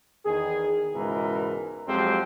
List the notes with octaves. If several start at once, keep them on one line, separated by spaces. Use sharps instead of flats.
E2 D#3 G#4
C#2 G#2 B2 E3 A#4
F2 F#3 G#3 C4 G4